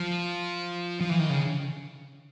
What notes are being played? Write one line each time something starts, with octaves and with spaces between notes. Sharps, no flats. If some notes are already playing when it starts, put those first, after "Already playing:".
Already playing: F3
F3
E3
D#3
C#3